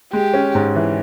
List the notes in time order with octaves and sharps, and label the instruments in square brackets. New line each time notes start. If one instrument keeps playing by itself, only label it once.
[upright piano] G#3 [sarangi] G4
[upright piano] C#4
G#2
E3